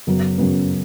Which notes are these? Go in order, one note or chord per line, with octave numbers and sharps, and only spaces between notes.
F#2 C#3 F#3 B3
F#2 C#3 F#3 B3